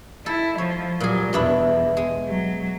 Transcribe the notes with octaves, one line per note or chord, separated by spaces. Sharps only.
E4 A4
F3 C#5
A#2 F#3 G3 G#4
E2 B2 D4 E4
G#3
F#3